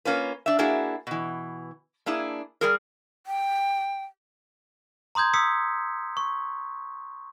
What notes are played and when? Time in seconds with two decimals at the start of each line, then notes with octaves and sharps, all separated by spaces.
0.05 A#3 C#4 F4 B4
0.46 D4 E5
0.59 A#3 D4 E4 F#4 G#4
1.07 B2 E3
2.06 A#3 D4 E4 G#4
2.61 G3 G#4 A#4
3.27 G5
5.15 A#5 C6 D#6 G6 G#6
5.34 D#6 E6 B6 C#7
6.17 C#6